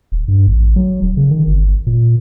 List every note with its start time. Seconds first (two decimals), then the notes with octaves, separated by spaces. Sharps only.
0.12 D#1
0.28 G2
0.47 A1
0.76 F#3
1.02 D#1
1.17 C#3
1.31 D#3
1.47 G1
1.87 A#2